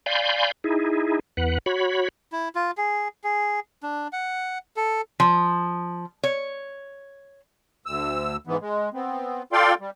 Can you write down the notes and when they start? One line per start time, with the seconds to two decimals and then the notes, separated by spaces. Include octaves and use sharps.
0.06 D5 F5 G#5 B5 C6 G6
0.64 D#4 E4 G#4
1.37 E2 B4 F#5
1.66 F#4 C#5 B5
2.32 E4
2.55 F4
2.77 G#4
3.24 G#4
3.83 D4
4.13 F#5
4.77 A4
5.20 F3
6.23 C#5
7.86 D2 E6
8.47 G#2 E3 B3
8.61 G#3
8.94 B3 C4
9.52 F4 A4 D5 F5 G5 C6
9.80 G3